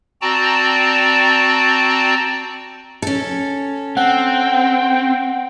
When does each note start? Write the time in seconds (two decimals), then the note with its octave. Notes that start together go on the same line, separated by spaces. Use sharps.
0.22 C4 F#4 D5 G5 A5 A#5
3.02 C#4 A4
3.97 C4 F#5 G5